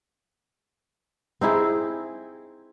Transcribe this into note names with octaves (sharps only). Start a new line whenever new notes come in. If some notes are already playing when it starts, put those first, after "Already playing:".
C4 D#4 E4 G#4